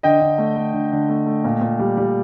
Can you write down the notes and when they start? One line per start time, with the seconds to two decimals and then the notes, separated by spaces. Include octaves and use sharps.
0.03 D3 D#5 G5
0.21 D3
0.38 A3
0.57 A3
0.73 D3
0.92 D3
1.09 A3
1.26 A3
1.44 A#2
1.61 A#2
1.79 G3
1.97 G3